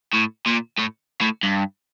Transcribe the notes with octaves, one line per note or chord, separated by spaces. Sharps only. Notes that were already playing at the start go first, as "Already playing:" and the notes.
A2
A#2
A2
A2
G2